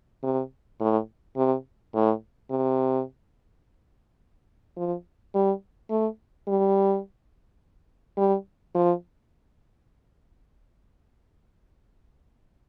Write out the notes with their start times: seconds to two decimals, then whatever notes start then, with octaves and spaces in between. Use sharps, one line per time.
0.23 C3
0.81 A2
1.36 C3
1.94 A2
2.51 C3
4.77 F3
5.35 G3
5.90 A3
6.47 G3
8.17 G3
8.75 F3